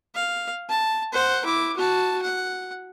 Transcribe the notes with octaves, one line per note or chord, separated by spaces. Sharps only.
F5
A5
C5 F#5
E4 D6
F#4 A5
F#5